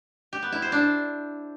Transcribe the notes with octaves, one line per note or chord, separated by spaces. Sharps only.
G4
B3
E4
C5
D4